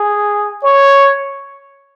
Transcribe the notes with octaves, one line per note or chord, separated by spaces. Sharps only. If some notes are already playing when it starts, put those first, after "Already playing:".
Already playing: G#4
C#5